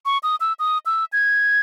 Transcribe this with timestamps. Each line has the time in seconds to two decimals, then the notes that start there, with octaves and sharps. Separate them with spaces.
0.05 C#6
0.23 D#6
0.40 E6
0.59 D#6
0.86 E6
1.13 G#6